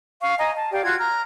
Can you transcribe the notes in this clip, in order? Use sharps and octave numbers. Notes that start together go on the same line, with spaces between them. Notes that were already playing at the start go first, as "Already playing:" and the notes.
F5 C#6
D#5 G#5 A#5
A5
G4 D5 F5 G5
F4 F#4 F#6 G#6
A#5 F6